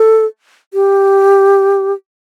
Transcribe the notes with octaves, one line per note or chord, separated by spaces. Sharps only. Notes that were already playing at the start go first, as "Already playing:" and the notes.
Already playing: A4
G4